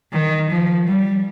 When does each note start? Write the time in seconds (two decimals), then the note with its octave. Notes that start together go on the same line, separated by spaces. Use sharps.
0.12 D#3
0.50 F3
0.87 G3